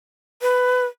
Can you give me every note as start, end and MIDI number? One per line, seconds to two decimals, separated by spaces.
0.42 0.85 71